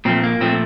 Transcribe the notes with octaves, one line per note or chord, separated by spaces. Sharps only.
A#2 F3 A3 C4
A#3
A#2 F3 A3 C4